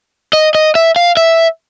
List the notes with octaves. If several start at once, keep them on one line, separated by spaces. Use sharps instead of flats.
D#5
D#5
E5
F5
E5